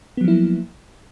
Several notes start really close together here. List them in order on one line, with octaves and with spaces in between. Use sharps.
B3 F#3 F3 E4 A#3